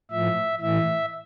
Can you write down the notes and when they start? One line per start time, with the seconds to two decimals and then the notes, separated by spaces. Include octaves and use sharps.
0.11 A2 F3 E5
0.61 A2 E3 E5